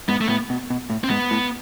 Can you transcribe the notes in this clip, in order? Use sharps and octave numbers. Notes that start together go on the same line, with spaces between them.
G#2 B3
A3
A2 B3
B2
B2
A2
C4
G#2 B3
A2